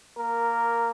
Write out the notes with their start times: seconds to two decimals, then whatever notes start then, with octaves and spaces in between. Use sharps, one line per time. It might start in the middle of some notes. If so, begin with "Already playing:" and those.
0.17 A#3 A#4